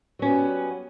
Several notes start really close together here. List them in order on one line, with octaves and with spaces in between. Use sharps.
F#3 C#4 B3 G3